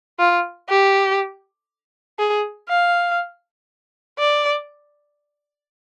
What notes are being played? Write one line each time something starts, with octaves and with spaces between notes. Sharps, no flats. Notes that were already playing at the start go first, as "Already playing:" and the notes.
F4
G4
G#4
F5
D5